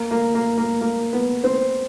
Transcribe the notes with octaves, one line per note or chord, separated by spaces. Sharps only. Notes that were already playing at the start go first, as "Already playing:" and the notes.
Already playing: A#3
A#3
A#3
A#3
A#3
B3
C4